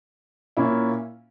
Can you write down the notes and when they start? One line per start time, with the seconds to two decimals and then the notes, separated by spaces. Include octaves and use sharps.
0.57 A#2 A#3 C#4 E4